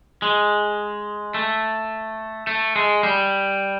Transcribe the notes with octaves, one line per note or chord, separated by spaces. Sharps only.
G#3
A3
A3
G#3
G3